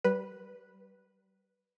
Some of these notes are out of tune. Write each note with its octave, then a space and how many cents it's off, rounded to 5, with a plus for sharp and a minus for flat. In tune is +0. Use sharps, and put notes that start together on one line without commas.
G3 -30 B4 -5